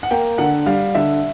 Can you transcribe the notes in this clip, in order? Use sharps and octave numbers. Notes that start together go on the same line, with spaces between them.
F#5
A#3 G5
D3 F#5
G3 F5
D3 E5